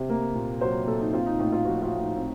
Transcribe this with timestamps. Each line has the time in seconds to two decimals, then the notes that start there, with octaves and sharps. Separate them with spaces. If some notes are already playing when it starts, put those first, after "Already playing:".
Already playing: C3
0.09 A#3
0.35 A#2
0.61 F#3 C5
0.87 A#2 A4
1.01 D#4
1.13 C4 F4
1.26 D#4
1.39 A2 D#4
1.52 F4
1.65 F3 F#4
1.82 F4
1.92 A2
2.00 D#4
2.17 C4